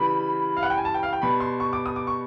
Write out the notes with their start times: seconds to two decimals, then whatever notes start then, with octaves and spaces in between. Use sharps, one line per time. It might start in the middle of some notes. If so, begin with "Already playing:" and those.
Already playing: C#3 E3 G3 B5
0.57 F5
0.63 F#5
0.70 G5
0.78 G#5
0.85 A5
0.94 G5
1.03 F5
1.13 G5
1.22 B2 G3 B5
1.40 C6
1.60 C#6
1.73 D6
1.86 D#6
1.96 D6
2.07 C#6